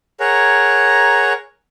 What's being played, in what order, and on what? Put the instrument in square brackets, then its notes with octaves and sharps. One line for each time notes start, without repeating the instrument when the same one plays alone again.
[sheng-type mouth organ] G#4 A#4 C#5 F#5 A#5